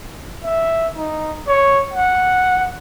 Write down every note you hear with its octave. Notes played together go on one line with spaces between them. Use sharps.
E5
D#4
C#5
F#5